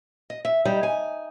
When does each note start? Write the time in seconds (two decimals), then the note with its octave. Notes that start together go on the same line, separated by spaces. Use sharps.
0.30 D#5
0.45 E5
0.65 G3 D#4
0.83 G#5